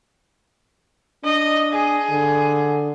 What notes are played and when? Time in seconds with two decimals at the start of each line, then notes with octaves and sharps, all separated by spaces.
1.25 D4 D#5
1.73 G#4
2.10 D3